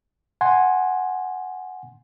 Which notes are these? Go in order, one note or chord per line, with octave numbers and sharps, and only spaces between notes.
F#5 G#5 C6